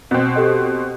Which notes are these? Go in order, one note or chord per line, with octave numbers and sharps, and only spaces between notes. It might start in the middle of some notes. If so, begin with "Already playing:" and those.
B2 C4
G4 A4 D#5